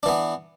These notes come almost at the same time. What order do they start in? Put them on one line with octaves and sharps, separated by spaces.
D4 E3 B3